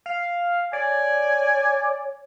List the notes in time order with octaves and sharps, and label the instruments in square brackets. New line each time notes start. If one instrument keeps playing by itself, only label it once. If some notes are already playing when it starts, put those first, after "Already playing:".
[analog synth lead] F5
[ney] C#5 [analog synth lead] D5 [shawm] G#5